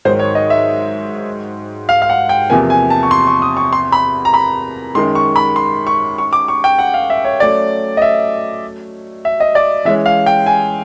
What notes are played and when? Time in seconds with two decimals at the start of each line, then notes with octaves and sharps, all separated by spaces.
0.05 G#2 D#3 F#3 C5
0.19 C#5
0.35 D#5
0.50 E5
1.89 F5
2.02 F5
2.09 F#5
2.29 G5
2.50 E2 C3 F3 A#3 G#5
2.70 G#5
2.90 A5
3.03 C#6
3.11 C6
3.27 C#6
3.42 D#6
3.57 C#6
3.73 C6
3.92 B5
4.25 A#5
4.34 B5
4.95 F#2 D#3 G#3 C6
5.15 C#6
5.36 B5
5.56 C6
5.87 C#6
6.18 C#6
6.33 D6
6.48 C#6
6.64 G5
6.79 F#5
6.94 F5
7.10 E5
7.25 C#5
7.40 F#3 A3 C#4 D5
7.97 D#5
8.02 E5
9.25 E5
9.40 D#5
9.55 D5
9.85 E3 G#3 C#4 E5
10.06 F5
10.26 G5
10.46 G#5